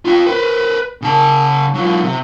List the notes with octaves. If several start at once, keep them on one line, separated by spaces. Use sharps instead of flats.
F4 G5
B4 C5
C#3 A5
F#3 F4
C3